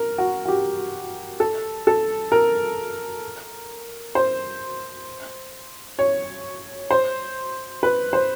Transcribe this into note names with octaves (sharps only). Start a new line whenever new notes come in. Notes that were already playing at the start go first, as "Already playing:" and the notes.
Already playing: A#4
F#4
F#4
G4
A4
A4
A#4
C5
C#5
C5
B4
C5